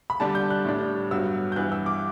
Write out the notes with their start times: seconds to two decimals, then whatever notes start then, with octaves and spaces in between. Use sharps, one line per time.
0.10 B5
0.20 D3 G3 D4 A5
0.35 G6
0.50 F#6
0.65 A2 G3 D4
1.11 G2 F#3 B3 E6
1.52 G6
1.56 G2 E3 B3 F#6
1.72 E6
1.86 D6